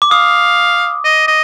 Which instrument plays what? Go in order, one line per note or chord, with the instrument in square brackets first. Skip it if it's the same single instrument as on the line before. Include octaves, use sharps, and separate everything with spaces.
[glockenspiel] D6
[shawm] F5 [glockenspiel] D#6
[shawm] D#5
D#5